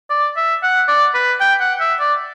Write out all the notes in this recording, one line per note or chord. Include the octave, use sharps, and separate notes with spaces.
D5
E5
F#5
D5
B4
G5
F#5
E5
D5